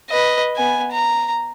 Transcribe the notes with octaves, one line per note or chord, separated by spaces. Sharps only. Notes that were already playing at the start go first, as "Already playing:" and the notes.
B4 D#5
B3 G#5
A#5